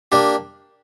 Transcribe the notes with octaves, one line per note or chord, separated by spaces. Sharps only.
A#3 D4 G4